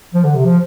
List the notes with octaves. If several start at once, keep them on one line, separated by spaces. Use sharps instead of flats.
F3
D3
C3
F3